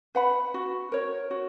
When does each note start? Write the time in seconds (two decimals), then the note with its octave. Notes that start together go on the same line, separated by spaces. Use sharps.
0.15 B4 F#5 B5
0.54 F#4
0.92 A#4 C#5
1.31 F#4